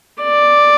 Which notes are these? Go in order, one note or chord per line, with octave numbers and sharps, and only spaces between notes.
D5